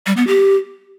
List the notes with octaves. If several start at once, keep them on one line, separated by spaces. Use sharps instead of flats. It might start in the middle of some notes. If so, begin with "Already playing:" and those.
G3
B3
G4